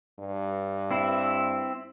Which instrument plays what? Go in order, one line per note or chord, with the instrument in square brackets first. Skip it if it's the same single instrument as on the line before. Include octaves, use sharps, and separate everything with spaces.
[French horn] G2
[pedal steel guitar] C4 E4